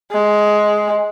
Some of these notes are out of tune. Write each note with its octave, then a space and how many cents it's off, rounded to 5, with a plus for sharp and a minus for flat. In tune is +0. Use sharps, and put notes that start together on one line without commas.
G#3 +10